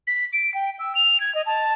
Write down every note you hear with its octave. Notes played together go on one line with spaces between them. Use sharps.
B6
D7
G5
E6
F7
G#6
D#5
A5